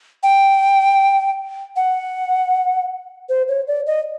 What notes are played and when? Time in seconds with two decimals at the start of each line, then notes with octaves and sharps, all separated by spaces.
0.23 G5
1.76 F#5
3.29 C5
3.48 C#5
3.67 D5
3.86 D#5